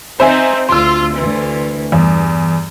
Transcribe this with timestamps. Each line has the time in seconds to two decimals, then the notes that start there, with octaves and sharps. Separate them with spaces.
0.20 C4 D#4 C5 E5 G#5
0.69 D2 F4 C6 E6
1.14 D2 E3
1.92 E2 G2